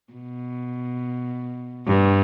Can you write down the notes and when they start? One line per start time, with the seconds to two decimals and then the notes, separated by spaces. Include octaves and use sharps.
0.13 B2
1.87 G2